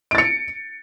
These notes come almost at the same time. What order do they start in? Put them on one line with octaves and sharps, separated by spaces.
D7 A6 C#7